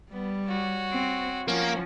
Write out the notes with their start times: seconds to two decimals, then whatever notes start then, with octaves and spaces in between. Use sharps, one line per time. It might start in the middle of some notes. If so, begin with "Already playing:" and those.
0.12 G3 B3
0.46 F#4 C#5
0.93 C4
1.48 F3 A#3 C#4 F#4